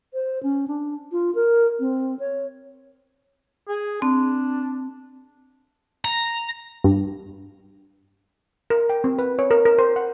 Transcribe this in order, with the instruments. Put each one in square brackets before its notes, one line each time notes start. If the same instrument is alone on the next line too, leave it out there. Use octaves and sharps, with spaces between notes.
[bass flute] C5
C#4
D4
F4
A#4
C4
C#5
[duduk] G#4
[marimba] C4 [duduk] D4
[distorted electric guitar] A#5
[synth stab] G2
[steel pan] A#4
G5
C4
B4
C#5
A#4
A#4
C5
F#5